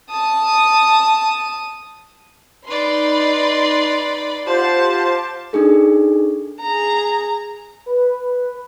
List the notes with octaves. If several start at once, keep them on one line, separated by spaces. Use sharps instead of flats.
A5 D#6
D#4 B4 D5 B5 C6
F4 G4 C5 F#5 A5
D4 D#4 G#4 A4
G#4 A#5
B4